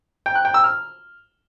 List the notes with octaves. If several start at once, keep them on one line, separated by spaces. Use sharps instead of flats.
G5
F#6
G5
E6
F6